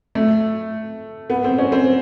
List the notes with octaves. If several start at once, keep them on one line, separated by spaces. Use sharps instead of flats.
A3
B3
C4
C#4
C4